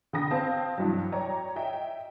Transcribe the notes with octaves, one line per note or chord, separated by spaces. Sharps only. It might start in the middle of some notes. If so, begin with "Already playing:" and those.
D3 G5 B5 D#6 A#6
C4 C5 F5 A5
G2 E3 F#3
C#5 D5 G5 A#5
D#5 E5 G5